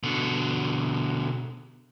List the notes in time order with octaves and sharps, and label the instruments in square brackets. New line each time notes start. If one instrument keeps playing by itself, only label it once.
[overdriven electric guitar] B2 D3